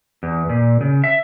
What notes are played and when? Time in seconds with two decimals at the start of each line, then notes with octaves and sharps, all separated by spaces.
0.23 E2
0.49 A#2
0.81 C#3
1.04 E5